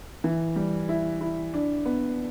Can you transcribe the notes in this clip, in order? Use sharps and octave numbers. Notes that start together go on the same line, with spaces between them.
E3
G3
E4
E4
D4
B3